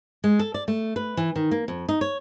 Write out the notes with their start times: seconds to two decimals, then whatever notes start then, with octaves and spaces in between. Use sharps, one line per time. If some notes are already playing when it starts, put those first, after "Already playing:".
0.24 G#3
0.39 A4
0.54 D5
0.68 A3
0.96 B4
1.17 E3
1.36 D#3
1.51 A#3
1.68 F2
1.89 D#4
2.01 C#5